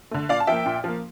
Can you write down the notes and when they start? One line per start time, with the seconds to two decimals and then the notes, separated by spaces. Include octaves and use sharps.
0.11 D3 A3
0.29 A#2 D5 F5
0.40 A5
0.47 F3 A#3 E5 G5
0.66 A#2
0.84 F3 A#3